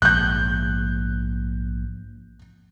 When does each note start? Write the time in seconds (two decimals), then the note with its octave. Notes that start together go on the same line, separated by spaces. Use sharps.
0.02 A#1 G#2 F#6 G6